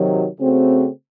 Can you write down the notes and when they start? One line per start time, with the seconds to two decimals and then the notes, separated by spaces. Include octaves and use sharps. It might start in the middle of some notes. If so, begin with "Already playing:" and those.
Already playing: C3 D#3 F#3
0.38 C#3 A3 C4 F#4